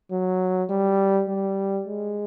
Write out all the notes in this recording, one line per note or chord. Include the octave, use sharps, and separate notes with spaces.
F#3
G3
G3
G#3